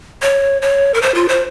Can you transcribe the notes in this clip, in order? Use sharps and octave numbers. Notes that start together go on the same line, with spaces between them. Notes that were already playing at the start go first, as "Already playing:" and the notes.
C#5
C#5
A#4
C5
F4
C5